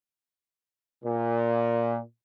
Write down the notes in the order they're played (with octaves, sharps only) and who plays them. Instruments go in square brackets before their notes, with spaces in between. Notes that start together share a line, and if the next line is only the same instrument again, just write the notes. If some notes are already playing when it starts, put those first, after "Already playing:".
[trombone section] A#2